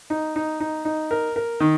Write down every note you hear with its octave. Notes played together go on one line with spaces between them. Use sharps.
D#4
D#4
D#4
D#4
A#4
A#4
D#3